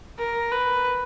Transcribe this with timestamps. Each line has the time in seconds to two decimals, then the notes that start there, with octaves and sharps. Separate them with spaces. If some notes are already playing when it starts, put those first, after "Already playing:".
0.18 A#4
0.52 B4